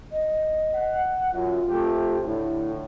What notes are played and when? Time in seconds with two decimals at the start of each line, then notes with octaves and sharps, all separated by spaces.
0.12 D#5
0.74 F#5
1.33 F#2 F4
1.68 C3 A3 G4
2.25 A2 D3 E4